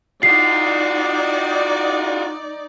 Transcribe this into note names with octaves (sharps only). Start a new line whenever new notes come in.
D#4 F4 F#4 D5 C7